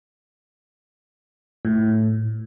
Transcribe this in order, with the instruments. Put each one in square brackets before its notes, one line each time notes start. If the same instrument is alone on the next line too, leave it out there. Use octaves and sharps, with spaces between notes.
[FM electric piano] A2